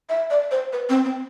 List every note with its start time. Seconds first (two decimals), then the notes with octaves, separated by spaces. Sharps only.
0.09 E5
0.30 D5
0.51 C5
0.73 B4
0.89 C4
1.05 C4